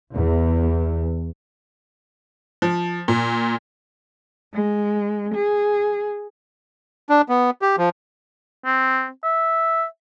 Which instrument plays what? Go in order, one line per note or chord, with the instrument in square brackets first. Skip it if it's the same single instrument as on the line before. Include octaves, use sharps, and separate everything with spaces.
[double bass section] E2
[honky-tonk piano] F3
A#2
[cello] G#3
G#4
[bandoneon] D4
B3
G4
F3
[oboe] C4
E5